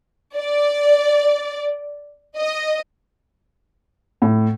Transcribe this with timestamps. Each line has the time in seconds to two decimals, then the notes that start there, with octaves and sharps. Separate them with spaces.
0.36 D5
2.37 D#5
4.22 A2